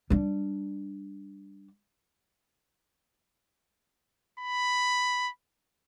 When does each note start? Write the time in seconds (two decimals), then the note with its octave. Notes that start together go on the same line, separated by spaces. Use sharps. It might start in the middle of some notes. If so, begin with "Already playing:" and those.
0.10 G3 D4
4.40 B5